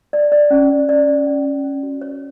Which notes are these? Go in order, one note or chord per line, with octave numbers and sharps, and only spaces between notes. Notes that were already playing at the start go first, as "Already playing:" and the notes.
D5
D5
C#4
D5
D5
C#4
C#4
C#4
C#4
F#4
C#5